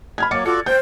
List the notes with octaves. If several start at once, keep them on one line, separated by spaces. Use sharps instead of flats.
B5 F6 G#6
F#3 A#3 D6 A6 C#7
F4 F#4 A4 D5 C#7
C5 G5 G6